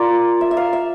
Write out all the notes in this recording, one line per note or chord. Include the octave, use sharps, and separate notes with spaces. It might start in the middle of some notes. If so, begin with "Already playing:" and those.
Already playing: F4 A#4 D5
E5
E5
F5
E5